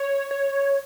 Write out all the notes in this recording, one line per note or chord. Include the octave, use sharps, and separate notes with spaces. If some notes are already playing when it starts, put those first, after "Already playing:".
Already playing: C#5
C#5